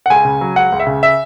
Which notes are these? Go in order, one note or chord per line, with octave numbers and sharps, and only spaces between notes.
F#5
C#2 G#5
C#3
F#3
C#2 F#5
C#2
E5
C#3
E5